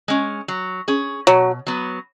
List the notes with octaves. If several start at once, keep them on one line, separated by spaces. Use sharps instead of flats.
G#3 C#4
F#3
C#4 G#4
B2 F#3
F#3 B3